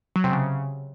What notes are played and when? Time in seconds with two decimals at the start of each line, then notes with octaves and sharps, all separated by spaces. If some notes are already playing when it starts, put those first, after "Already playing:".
0.16 F#3
0.24 C3
0.32 C#3